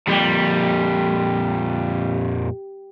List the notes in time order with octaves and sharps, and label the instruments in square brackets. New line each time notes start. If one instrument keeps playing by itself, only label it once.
[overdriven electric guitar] F2 A#2 [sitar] G3